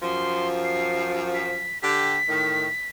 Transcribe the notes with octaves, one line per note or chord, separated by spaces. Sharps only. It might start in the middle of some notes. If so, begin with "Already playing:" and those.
F#2 F3 C6
C7
B6
D3 G4 B6
A2 D#3